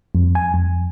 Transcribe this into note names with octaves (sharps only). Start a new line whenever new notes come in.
F2
G#5
F2